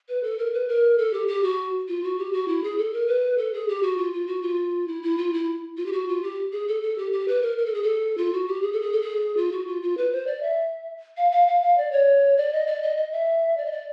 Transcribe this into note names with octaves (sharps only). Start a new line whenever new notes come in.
B4
A4
A#4
B4
A#4
A4
G4
G4
F#4
F4
F#4
G4
F#4
E4
G#4
A4
A#4
B4
A4
G#4
G4
F#4
F4
F4
F#4
F4
E4
E4
F4
E4
F4
G4
F#4
F4
G4
G#4
A4
A4
G4
G4
B4
A#4
A#4
A4
G#4
A4
F4
F#4
G4
G#4
A4
G#4
A4
G#4
F4
F#4
F4
F4
B4
C5
D5
E5
F5
F5
F5
F5
D5
C#5
D5
D#5
D5
D#5
D#5
E5
D5
D#5
D5